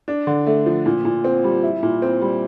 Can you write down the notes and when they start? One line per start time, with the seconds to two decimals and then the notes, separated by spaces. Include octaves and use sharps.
0.08 D4
0.27 D3
0.47 A3
0.66 F3
0.85 A#2
1.05 A#2
1.24 C4
1.44 G3
1.63 E4
1.83 A#2
2.02 C4
2.21 G3